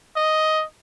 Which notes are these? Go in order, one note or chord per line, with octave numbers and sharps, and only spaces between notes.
D#5